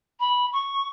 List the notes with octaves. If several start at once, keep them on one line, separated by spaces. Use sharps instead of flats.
B5
C#6